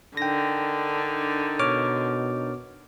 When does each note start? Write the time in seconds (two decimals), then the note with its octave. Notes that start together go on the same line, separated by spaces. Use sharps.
0.17 D3 D4 D#4 A#4 G5 A#6
1.60 B2 C#5 D6 F6